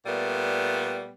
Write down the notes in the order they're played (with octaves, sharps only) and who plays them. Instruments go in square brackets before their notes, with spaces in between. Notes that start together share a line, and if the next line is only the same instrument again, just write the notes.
[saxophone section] A#2 G3 A3 B3